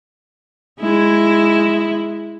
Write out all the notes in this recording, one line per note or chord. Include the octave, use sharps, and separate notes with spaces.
G#3 E4